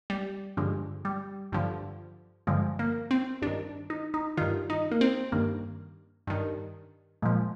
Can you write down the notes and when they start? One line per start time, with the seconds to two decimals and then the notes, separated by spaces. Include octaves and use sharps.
0.10 G3
0.57 G2 D3 F3 G#3
1.05 G3
1.52 G2 D3 F3
2.47 G2 D3 F3 G#3
2.79 A#3
3.11 C4
3.42 G2 D#3 D4
3.90 D#4
4.14 D#4
4.37 G2 D#3 F4
4.70 D#4
4.92 A#3
5.01 C4
5.32 G2 D#3 A#3
6.27 G2 D#3
7.22 A#2 F3 G#3